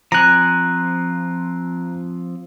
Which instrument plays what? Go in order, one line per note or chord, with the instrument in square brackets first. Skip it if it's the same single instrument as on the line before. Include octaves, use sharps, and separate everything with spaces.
[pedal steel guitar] F3 C4 G#5 [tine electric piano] A#5 F#6